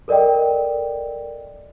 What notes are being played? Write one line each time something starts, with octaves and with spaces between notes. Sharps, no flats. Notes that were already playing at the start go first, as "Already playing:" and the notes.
A4 A#4 D5 D#5 G5